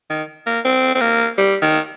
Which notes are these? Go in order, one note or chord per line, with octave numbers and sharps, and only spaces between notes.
D#3
A#3
C4
C4
A#3
G3
D#3